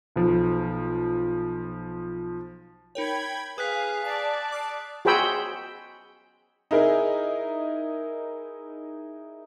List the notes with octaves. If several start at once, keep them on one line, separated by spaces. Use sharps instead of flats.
B1 F3
D#4 A#4 C#5 G5 B5 G#6
G#4 B4 F5 D#6 F#6 B6
D5 A5 C7
D6 F6 C7
F#4 G#4 C5 G5 B5 E6
D#4 E4 G#4 A#4